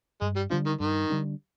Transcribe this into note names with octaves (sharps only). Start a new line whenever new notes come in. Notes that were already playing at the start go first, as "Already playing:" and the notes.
G2 G#3
G3
D3 F3 G3 D4
D#3
G2 D#3
D3 G3 D4